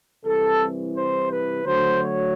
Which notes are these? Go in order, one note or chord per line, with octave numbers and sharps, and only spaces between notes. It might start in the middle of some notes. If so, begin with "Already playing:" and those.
C2 C3 E3 A4
C5
B4
D2 D3 F#3 A3 C5
C#5